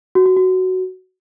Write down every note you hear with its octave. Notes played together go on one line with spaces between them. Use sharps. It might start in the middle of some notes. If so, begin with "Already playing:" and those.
F#4
F#4
F#4